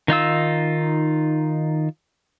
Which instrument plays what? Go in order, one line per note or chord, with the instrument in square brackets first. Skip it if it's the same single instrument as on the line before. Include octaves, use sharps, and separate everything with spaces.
[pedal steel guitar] D#3 D#4 F4 E6